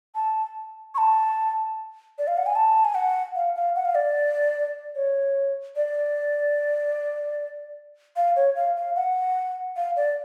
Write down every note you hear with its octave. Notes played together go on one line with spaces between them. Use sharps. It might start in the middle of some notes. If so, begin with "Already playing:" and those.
A5
C#6
A5
D5
F5
F#5
G#5
A5
G#5
F#5
F5
F5
F#5
F5
D5
C#5
D5
F5
C#5
F5
F5
F#5
F5
D5